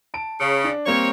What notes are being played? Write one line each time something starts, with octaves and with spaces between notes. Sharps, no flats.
A5 D7
C#3
D4
G3 A#3 C4 C#5